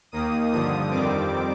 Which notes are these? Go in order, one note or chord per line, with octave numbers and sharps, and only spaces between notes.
D#2 D#3 A#3 D#6
G2 D3 F3 D#6
F2 D#3 G3 C4 D6